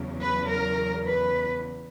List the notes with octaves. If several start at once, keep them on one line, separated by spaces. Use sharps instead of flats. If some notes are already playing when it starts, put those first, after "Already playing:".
Already playing: E2 C#3 F#3
B4
A#4
B4